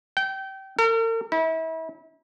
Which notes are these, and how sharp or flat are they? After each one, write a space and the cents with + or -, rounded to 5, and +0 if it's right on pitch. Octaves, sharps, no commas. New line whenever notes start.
G5 -25
A#4 -45
E4 -35